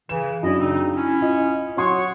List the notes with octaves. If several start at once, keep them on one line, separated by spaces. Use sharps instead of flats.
C#3 E3 E7
F#2 D4 E4 D#5
C#3 C4 D#4
C#4 E4
F4 D#5
F#3 C#5 F#5 C6 C#6 D#6